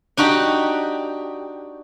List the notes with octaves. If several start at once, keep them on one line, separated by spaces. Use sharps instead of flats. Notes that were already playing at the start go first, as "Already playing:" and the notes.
D4 D#4 F#4 G4